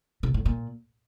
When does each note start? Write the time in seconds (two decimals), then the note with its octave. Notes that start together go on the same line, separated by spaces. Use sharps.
0.23 C3
0.34 A2
0.45 A#2